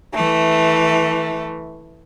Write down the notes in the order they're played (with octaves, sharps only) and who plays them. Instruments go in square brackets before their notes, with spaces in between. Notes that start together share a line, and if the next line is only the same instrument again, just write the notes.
[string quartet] E3 A3